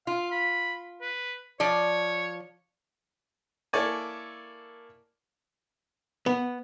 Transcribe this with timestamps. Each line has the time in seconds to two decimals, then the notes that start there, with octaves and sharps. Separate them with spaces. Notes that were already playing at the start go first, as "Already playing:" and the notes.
0.07 F4 F5
0.32 B5
1.01 B4
1.60 F3 C#5 D5
3.73 A#3 E4 A4 C#5 D5 G#5
6.26 B3